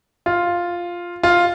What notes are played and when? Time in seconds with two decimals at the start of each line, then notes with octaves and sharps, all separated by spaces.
0.26 F4
1.23 F4